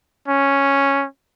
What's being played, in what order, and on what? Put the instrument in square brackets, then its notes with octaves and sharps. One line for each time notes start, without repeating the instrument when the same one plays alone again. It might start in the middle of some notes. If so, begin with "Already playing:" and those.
[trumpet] C#4